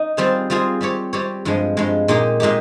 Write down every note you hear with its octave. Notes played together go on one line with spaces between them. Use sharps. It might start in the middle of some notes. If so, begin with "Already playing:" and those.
Already playing: D#4
G3 C4 F4 G#4 C5
G3 C4 F4 G#4 C5
G3 C4 G4 C#5
G3 C4 G4 C#5
G2 F3 G#3
G2 F3 G#3
A#2 G#3 D#4 G4
A#2 G#3 D#4 G4